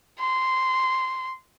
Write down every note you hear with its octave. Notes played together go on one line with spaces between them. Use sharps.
C6